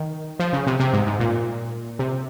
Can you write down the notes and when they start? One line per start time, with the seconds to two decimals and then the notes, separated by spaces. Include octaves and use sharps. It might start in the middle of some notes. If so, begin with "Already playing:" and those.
Already playing: D#3
0.39 F3
0.53 C#3
0.67 C3
0.80 C3
0.93 G#2
1.07 G#2
1.20 A#2
1.99 C3